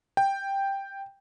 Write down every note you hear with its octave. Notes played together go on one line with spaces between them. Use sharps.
G5